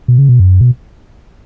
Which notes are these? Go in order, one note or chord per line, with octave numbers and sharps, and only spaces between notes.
B2
C#3
B2
F#2
B2